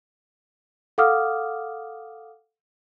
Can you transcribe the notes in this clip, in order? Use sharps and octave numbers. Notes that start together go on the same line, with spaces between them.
A4 F5 F#5 D6 D#6 F6